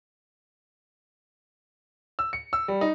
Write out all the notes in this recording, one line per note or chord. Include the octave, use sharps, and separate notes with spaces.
E6
C#7
E6
G3
D#4